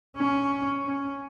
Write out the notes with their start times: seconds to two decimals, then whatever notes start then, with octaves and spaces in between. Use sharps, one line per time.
0.17 C#4
0.86 C#4